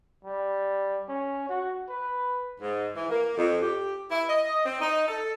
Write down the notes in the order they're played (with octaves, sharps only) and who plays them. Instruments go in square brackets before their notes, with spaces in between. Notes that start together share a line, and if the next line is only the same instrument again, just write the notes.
[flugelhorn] G3
C#4
F#4
B4
[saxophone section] G#2
E3
A#3
F2
G4
E4
D#5
C4
D#4
A4